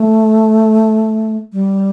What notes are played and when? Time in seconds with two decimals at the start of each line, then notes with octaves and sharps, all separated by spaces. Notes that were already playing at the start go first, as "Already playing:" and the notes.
Already playing: A3
1.53 G3